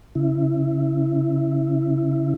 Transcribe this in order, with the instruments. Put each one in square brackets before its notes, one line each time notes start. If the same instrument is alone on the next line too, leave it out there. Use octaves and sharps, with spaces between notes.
[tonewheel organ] C#3 E4